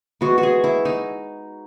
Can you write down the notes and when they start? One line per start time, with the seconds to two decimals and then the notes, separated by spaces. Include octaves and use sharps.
0.21 E3 G#3 B3 F#4
0.38 F#4
0.43 G#4
0.64 E4
0.85 D#4